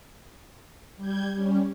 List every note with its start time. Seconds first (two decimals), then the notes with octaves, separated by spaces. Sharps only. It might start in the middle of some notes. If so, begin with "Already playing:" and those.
0.97 G3 G6 G#6
1.34 G3 C#4